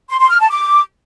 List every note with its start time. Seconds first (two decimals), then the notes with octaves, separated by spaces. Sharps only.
0.10 C6
0.20 C6
0.30 F6
0.40 A5
0.50 D6